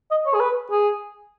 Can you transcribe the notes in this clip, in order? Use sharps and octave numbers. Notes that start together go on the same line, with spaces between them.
D#5
C#5
G#4
B4
G#4